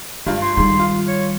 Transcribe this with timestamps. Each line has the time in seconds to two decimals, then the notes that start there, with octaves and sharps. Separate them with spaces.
0.26 G2 G#3 F4
0.42 C6
0.57 G#2 D#3 G3
0.79 F4
1.08 C#5